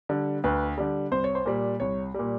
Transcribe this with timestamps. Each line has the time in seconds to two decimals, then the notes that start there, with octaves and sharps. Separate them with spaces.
0.09 D3 G3
0.44 D2 B4
0.78 D3 G3
1.11 C2 C5
1.24 C#5
1.35 C5
1.46 A#2 G3
1.80 C2 C#5
2.14 A#2 G3